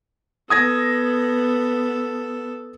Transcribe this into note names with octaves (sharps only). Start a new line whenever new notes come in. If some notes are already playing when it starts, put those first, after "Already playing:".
B3 A4 D#6 G#6 A#6